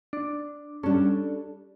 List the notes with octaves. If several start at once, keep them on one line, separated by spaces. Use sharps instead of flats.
D4
G3 C#4 D4 A4